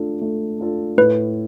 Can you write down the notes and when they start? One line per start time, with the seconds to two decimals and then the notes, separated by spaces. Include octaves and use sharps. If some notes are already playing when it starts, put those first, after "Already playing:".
Already playing: A3 D4 F4 A4
0.21 A3
0.59 D4 F4 A4
0.97 A2 B4